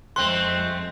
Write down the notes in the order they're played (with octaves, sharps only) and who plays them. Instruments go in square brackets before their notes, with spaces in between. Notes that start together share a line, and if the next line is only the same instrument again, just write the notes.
[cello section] F2 G#3 [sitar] A3 C4 [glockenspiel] C6 [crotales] F#6